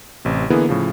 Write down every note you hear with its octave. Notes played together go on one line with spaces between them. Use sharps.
A1 C3
D3 E3 A#3 B3 E4 G#4
A2 C#3 F3